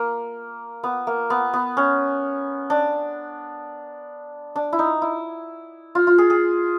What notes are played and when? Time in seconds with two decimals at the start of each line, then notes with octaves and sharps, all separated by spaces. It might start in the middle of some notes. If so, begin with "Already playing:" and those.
Already playing: A#3
0.84 B3
1.07 A#3
1.30 B3
1.53 B3
1.77 C#4
2.70 D4
4.56 D4
4.73 E4
4.79 D#4
5.02 E4
5.95 F4
6.07 F4
6.18 G#4
6.30 G#4